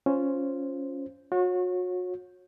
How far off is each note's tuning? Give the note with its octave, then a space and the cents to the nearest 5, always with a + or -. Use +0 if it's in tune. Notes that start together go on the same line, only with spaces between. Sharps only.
C#4 +0 F4 +0 C5 +0
F#4 -35 C#5 -20